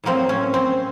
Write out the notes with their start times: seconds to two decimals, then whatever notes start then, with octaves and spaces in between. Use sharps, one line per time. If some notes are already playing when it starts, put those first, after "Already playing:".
0.04 A2 F#3 A#3 C4
0.29 C#4
0.54 C4